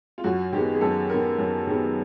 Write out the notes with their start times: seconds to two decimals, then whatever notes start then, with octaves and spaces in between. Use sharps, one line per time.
0.18 F4
0.24 F#2 F#4
0.52 D#3 G#3 B3 G4
0.71 G#4
0.81 F#2 A4
1.09 D#3 G#3 B3 A#4
1.38 F#2
1.67 D#3 G#3 B3